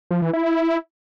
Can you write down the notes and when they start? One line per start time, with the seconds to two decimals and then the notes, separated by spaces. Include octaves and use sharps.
0.11 F3
0.22 E3
0.33 E4